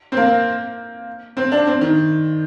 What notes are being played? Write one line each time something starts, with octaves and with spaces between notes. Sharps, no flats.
C4
A#3
C4
D4
C4
D#3